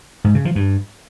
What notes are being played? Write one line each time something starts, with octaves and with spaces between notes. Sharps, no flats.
G#2
C#3
F3
G2